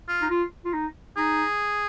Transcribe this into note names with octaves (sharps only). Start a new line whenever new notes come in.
F4
D#4
F4
F4
D#4
D#4 G#4